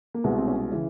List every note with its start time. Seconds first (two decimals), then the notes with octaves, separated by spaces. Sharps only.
0.14 A#3
0.24 C2 B2 G#3 B3
0.38 C4
0.47 B3 C#4
0.71 C#3 E3